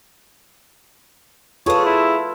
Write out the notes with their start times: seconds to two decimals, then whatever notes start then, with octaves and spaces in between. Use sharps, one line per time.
1.66 A3 F4 G#4 A4 B4 C#5
1.85 E4